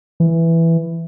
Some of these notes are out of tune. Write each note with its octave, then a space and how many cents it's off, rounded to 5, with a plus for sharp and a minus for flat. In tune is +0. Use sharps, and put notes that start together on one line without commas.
E3 +5